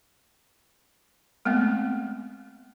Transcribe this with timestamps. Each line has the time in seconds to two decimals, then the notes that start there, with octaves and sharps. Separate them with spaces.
1.45 G#3 A3 B3 C4